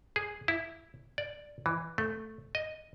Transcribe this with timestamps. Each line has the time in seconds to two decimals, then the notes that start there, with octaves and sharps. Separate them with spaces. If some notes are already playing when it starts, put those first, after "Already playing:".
0.16 G#4
0.48 E4
1.18 D5
1.66 E3
1.98 A3
2.55 D#5